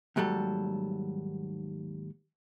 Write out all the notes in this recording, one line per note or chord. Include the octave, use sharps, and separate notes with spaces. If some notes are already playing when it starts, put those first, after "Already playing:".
D#2 G#2 F#3 G3 A4